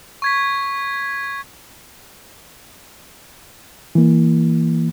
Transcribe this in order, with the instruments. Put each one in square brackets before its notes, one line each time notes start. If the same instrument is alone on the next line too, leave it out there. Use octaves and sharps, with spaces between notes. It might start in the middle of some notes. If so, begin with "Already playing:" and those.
[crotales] C#6 G#6 B6
[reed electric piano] E3 A#3